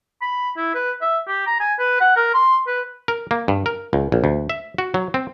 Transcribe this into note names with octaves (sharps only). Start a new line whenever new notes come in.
B5
E4
B4
E5
G4
A#5
G#5
B4
F#5
A#4
C6
B4
A#4
A#3
G2
A#4
C#2
A#1
D2
E5
F#4
F#3
C4